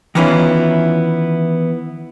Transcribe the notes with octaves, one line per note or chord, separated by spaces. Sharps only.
D#3 E3 B3 C#4 E4 F4